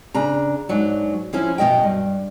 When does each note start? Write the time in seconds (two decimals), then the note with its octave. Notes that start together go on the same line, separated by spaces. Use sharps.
0.14 C#3 D4 A#5
0.69 G#2 F#3 D4
1.33 F3 C#4 E4
1.58 F#2 B2 A#3 D#5 G5
1.83 G2